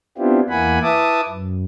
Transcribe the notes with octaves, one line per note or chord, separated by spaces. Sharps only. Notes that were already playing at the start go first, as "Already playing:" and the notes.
B3 C4 D4 E4 F4 G4
E2 A#3 E4 F#5 G#5 B5
E4 B4 E5 A5 D6 D#6
F#2